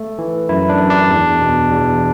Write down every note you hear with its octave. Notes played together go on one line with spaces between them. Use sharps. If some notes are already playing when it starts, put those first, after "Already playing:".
Already playing: A3
E3
F#2 E4
D4
F#2
D4
E2
B2
E2